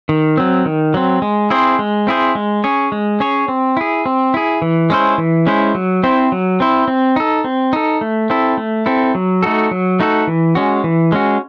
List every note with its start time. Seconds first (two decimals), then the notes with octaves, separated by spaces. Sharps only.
0.09 D#3
0.37 F#3 C4
0.66 D#3
0.94 F#3 C4
1.22 G#3
1.50 C4 E4 G#4 C5
1.79 G#3
2.07 C4 E4 G#4 C5
2.35 G#3
2.64 C#4 G#4 C#5
2.92 G#3
3.20 C#4 G#4 C#5
3.48 C4
3.77 E4 G#4
4.06 C4
4.34 E4 G#4
4.62 E3
4.90 G#3 C#4 E4 C5
5.18 E3
5.47 G#3 C#4 E4 C5
5.75 F#3
6.03 C4 E4 C5
6.32 F#3
6.60 C4 E4 C5
6.88 C4
7.16 D#4 A4
7.44 C4
7.73 D#4 A4
8.01 A3
8.30 C4 E4 A4
8.58 A3
8.86 C4 E4 A4
9.15 F#3
9.43 A3 D#4 F#4 A4
9.71 F#3
10.00 A3 D#4 F#4 A4
10.27 E3
10.55 G#3 C#4 F#4
10.84 E3
11.12 G#3 C#4 F#4